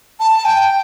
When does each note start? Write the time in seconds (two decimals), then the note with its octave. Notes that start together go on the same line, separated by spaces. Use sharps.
0.20 A5
0.45 G5